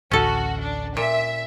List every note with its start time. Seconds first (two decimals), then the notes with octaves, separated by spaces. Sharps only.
0.11 A1 D2 C#4 F#4 A4
0.61 D4
0.97 A#2 E5